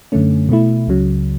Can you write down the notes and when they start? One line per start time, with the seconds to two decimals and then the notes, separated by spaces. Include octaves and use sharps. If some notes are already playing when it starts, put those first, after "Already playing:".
0.12 F#2 D3 A3 C#4
0.49 B2 A3 E4
0.87 C#2 C#3 F#3